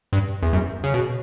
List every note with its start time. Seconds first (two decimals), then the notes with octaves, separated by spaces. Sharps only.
0.13 G2
0.43 E2
0.53 F#2
0.84 C#3
0.94 B2